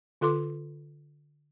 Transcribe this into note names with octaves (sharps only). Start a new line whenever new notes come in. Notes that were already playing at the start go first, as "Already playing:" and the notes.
D3 F4 A4 C6 D6